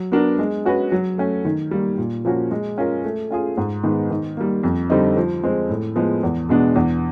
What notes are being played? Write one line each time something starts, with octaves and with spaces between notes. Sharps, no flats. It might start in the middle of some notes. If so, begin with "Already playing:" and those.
Already playing: F#3
B3 D4 F#4 A#4
G#3
C#4 F#4 B4
F#3
A3 C#4
D#3
G3 A#3
A#2
F3 A#3 C#4 F#4
G#3
C#4 F4 A#4
A3
C#4 F4 G#4
G#2
D#3 G#3 B3
D#3
G3 A#3
F2
D3 G3 C4 D#4
F3
G#3 C4
A2
F3 G#3 B3
E2
B2 G#3 B3 D4
E2